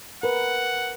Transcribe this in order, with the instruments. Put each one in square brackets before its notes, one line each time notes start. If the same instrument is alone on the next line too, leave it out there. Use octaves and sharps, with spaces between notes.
[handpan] A#4 B4 [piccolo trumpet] F#5